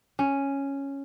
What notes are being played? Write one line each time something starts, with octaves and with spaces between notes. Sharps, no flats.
C#4